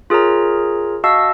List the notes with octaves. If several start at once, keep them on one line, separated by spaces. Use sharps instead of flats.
F4 G#4 A#4 C#5 A#5
F#4 D#5 F5 A5 C#6 E6